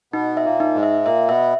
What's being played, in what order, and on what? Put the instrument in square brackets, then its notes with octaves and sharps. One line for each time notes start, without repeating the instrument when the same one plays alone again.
[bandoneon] B2 B3 [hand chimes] D#4
[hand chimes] E5
[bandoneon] A#2 A#3
[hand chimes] D#4
[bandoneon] G#2 G#3
[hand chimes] E5
[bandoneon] A#2 A#3 [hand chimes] E5
[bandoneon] B2 B3 [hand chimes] E5